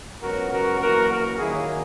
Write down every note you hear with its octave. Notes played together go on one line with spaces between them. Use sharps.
C#2 C#3 F#3 B3 F#4 A#4
F#4 A#4
F#2 E3 A#3 F#4 A#4
F#4 A#4
D#2 D#3 F#3 A#3 E4 G#4